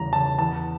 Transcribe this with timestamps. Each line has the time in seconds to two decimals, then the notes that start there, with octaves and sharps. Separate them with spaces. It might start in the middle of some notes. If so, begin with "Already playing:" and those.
Already playing: E2 C#3 G3 A#5
0.13 C#3 A5
0.39 E2 A5